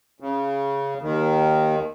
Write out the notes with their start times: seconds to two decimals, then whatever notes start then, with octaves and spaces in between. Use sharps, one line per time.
0.20 C#3
1.02 D#2 D#3